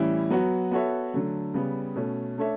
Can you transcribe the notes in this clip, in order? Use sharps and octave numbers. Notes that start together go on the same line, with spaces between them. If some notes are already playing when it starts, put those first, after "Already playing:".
Already playing: A2 E3 G3 C#4 E4
F#3 B3 F#4
B3 F#4 A4 C#5 E5
D3 F#3 A3
C#3 G3 B3
B2 A3 C#4
A3 D4 A4 C#5 E5